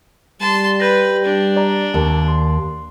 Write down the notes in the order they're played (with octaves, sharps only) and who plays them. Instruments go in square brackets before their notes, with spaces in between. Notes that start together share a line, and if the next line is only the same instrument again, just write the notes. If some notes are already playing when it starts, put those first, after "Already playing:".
[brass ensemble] G3 [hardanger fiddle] A5 C6
[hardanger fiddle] B4 [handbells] G6 A#6
[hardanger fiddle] D4
[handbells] D5 A#5
[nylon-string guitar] D#2 [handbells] A5
[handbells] C6